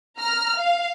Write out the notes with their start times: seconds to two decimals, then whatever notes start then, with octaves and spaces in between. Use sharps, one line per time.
0.18 A#5 F6
0.59 F5